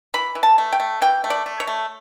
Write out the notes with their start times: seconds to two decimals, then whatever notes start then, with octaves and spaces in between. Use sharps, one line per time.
0.14 E3 B5
0.35 E3
0.43 A5
0.58 A3
0.72 G5
0.80 A3
1.02 E3 G5
1.24 A3
1.30 D5
1.46 A3
1.60 C#5
1.67 A3